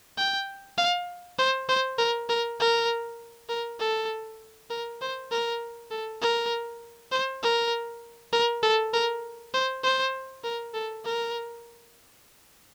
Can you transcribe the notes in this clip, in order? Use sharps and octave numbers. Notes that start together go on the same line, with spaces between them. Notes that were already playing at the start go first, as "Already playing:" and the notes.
G5
F5
C5
C5
A#4
A#4
A#4
A#4
A4
A#4
C5
A#4
A4
A#4
C5
A#4
A#4
A4
A#4
C5
C5
A#4
A4
A#4